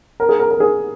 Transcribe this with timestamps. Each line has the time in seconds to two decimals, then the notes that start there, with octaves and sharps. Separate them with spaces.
0.20 A#4
0.29 G#4
0.39 A#4
0.51 A#4
0.60 G#4